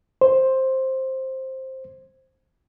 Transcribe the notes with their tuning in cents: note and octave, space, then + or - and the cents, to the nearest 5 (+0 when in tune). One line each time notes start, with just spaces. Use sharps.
C5 +10